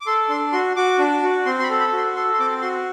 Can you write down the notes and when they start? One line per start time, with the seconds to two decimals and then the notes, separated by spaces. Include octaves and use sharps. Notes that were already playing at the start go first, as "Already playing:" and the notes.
0.01 D6
0.07 A4 C6
0.29 D4 C6
0.52 F#4 C6
0.76 F#4 D6
0.99 D4
1.23 F#4
1.46 C4 C6
1.59 C6
1.63 B5
1.70 A4
1.80 B5
1.92 F#4
1.98 C6
2.16 A4 C6
2.34 C6
2.39 C4 D6
2.62 F#4 C6